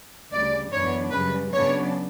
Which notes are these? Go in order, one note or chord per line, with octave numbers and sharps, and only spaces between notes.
D2 C#3 G3 D5
F#2 E3 B3 D4 C#5
F#2 C#3 G3 B4
C#3 F#3 B3 D4 C#5